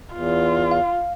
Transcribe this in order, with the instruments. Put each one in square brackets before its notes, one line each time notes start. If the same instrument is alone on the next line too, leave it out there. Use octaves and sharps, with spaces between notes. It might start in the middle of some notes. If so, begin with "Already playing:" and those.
[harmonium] E2 [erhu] F4
[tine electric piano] F5